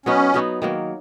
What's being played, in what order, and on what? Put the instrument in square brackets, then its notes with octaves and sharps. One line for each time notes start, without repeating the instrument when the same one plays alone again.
[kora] F#3 B3 D#4 [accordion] C#4
[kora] F#3 B3 D#4
D#3 F#3 A#3